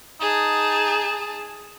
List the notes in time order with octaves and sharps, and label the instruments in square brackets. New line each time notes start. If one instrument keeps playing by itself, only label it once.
[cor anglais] D#4 [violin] G#4 A5